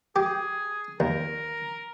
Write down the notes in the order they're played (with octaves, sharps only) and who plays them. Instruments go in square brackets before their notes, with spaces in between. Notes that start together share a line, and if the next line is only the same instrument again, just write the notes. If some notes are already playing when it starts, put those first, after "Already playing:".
[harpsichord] G4 [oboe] G#4
[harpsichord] D#2 [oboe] A#4